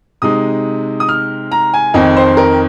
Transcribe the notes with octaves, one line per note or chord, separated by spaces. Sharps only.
C3 G#3 D#4 D#6
D#6
F6
A#5
G#5
F2 D#3 C4 D#5
C5
A#4